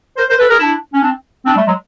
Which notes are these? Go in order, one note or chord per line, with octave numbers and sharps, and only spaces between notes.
A#4 C5
A#4 C5
A4 B4
G#4 A#4
D4 E4
C#4
C4 D4
C4 D4
G3 A3
F#3 G#3